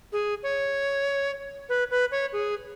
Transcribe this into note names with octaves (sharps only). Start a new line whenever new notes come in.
G#4
C#5
B4
B4
C#5
G#4